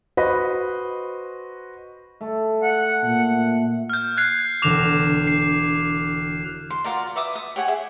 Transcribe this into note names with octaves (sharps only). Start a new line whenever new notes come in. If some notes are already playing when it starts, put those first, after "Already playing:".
F#4 B4 C5 D#5 B5
A3
F#5
A#2
F6 G6
F#6 G#6 C7
E1 D3 D6 A#6 E7 F7
C7
C6
F4 F#4 A#4 D5
B4 E5 D6 D#6
D#6
G4 C#5 F#5 G#5
G#4 E5